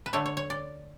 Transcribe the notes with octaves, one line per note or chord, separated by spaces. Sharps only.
B4
D3 A3 C#5
C#5
C#5
D5